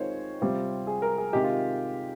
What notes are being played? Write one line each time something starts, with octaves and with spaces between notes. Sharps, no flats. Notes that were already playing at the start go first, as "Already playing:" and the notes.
Already playing: D#3 G#3 C4 F4 C5 C#5
C3 G3 C4 F4
G#4
A#4
G#4
C3 D#3 G#3 G4
F4